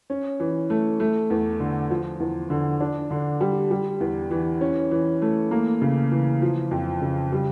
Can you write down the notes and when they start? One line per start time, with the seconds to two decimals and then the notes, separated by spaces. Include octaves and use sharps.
0.10 C#4
0.40 E3
0.70 A3
1.00 A3
1.30 E2
1.60 D3
1.90 F3
2.20 E2
2.50 D3
2.81 D4
3.11 D3
3.41 G3
3.71 G3
4.00 E2
4.31 E3
4.61 C#4
4.91 E3
5.22 A3
5.51 A#3
5.82 C#3
6.12 E3
6.42 F3
6.71 F2
7.02 C#3
7.32 G3